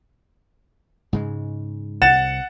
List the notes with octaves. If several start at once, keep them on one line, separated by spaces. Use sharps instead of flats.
G#2 C#3 G#3
C2 F#5 A6 E7